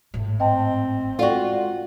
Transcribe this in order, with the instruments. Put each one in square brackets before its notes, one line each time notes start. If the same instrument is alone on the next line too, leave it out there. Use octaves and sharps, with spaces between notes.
[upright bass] G#1 A2
[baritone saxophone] C4 [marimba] D#5 G5 A5
[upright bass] G#3 [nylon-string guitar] F4 F#4 [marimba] A4 D5 G5